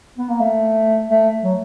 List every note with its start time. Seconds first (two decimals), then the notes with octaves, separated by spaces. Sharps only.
0.18 B3
0.29 A#3
0.40 A3
1.09 A3
1.43 F#3